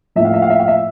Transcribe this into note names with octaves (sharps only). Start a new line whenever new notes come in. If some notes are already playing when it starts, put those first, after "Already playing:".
A2 F3 A#3 E5
F5
E5
F5
E5
F5
E5